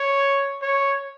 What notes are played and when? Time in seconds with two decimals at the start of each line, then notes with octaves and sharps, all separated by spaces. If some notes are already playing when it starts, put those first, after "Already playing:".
Already playing: C#5
0.62 C#5